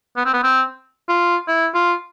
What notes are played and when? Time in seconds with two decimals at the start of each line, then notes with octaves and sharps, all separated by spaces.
0.17 B3
0.25 C4
0.34 B3
0.43 C4
1.09 F4
1.48 E4
1.74 F4